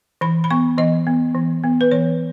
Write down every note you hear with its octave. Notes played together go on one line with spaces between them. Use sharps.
E3 B5
B5
B3 C#6
E3 D#5
B3
E3
B3
B4
E3 C#5